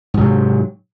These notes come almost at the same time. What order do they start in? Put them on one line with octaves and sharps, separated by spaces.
G#2 C3 F#3